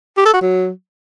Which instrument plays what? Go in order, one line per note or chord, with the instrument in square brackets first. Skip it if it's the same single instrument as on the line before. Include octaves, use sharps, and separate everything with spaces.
[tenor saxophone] G4
A4
F#4
F#3